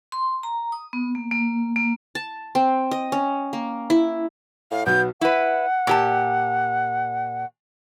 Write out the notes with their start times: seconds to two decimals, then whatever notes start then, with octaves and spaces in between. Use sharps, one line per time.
0.12 C6
0.43 A#5
0.72 D#6
0.93 B3
1.15 A#3
1.31 A#3
1.76 A#3
2.15 A5
2.55 C4
2.91 D#5
3.12 C#4
3.53 A#3
3.90 E4
4.71 A2 F5
4.86 B1 B2 B3 G6
5.21 E4 B4 F#5
5.87 A#2 G4 A5